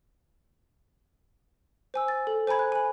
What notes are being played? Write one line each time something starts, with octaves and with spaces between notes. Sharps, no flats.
C5 G#5 E6
A6
A4
C5 G#5 A#5 B5 G#6
F#6
G#5 B5